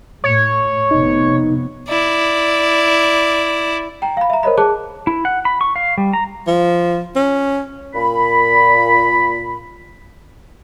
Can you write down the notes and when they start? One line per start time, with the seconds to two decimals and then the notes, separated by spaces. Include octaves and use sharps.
0.24 A2 C#5
0.91 F1 C3 B3 D#4
1.89 E4 D5
4.02 G5 A#5
4.17 F5 B5
4.30 E5 A#5
4.43 A#4 C5 C#5 D#5 B5
4.58 G#4 A5 D6 F#6
5.07 E4
5.25 F#5
5.45 B5
5.61 C#6
5.76 F5
5.98 G3
6.13 A#5
6.47 F3
7.16 C#4
7.95 A#2 B5